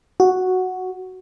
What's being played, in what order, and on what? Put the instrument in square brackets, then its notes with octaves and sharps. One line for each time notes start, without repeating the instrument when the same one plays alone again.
[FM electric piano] F#4